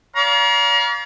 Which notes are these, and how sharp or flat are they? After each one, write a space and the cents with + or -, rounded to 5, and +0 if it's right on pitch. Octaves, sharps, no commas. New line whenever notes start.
D5 -45 F5 +5 A#5 +40